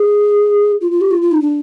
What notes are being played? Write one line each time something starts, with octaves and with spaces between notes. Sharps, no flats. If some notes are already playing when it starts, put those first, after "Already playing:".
Already playing: G#4
F4
F4
G4
F4
F4
D#4
D4